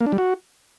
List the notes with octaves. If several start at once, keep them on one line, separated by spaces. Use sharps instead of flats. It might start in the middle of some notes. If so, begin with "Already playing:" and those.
A#3
D4
G3
F#4